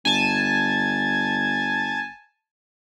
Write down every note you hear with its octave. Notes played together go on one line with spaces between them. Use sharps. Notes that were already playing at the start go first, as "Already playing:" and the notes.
G1 G#5 A5